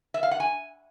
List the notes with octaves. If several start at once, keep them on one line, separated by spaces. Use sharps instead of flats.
E5
F5
F#5
G#5